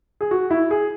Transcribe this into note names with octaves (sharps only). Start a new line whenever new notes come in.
G#4
F#4
E4
G#4